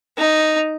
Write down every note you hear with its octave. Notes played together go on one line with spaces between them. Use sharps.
D#4